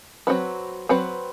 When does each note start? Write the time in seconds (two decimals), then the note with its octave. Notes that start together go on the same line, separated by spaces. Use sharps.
0.27 F#3 C4 F#4 B4
0.89 F#3 C4 F#4 B4